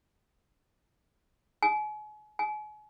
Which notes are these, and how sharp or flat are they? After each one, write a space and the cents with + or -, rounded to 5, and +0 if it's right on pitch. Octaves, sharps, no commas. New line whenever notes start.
G#5 +40
G#5 +40